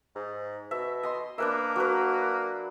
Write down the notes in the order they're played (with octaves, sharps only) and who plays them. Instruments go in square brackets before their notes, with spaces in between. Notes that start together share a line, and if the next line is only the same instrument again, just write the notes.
[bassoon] G#2
[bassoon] B2 [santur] E5
[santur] D#5 C6
[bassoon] A#3 [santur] D4 B4 E5
[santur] F#3 A#4 B4